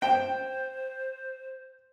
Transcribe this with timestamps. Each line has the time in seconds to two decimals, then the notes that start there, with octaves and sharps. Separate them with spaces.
0.02 C5 G5